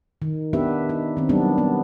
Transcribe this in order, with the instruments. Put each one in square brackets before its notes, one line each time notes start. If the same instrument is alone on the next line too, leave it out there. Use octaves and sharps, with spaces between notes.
[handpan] D#3
B3 D4 G4 B4 E5
D#4
D#3 C4
F#3 G3 B3 D4
B3